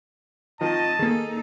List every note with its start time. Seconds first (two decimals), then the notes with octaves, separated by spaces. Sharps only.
0.61 D#3 F3 C4 D#5 A5
0.99 D#3 A#3 D#4 G#4 A4